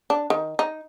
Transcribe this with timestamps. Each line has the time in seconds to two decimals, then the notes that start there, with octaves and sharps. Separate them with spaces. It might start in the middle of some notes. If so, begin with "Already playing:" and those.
0.10 D4
0.30 D#3
0.59 D#4